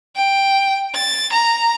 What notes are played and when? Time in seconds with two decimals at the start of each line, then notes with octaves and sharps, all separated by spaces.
0.16 G5
0.94 A6
1.33 A#5